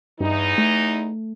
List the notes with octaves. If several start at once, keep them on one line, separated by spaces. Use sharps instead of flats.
E2 G2 E3 D#4
A3